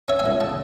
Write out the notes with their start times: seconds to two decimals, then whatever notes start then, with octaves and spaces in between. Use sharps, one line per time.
0.08 C#4 C#5 E5
0.19 E5 G#5
0.26 C#2
0.41 C#3 A5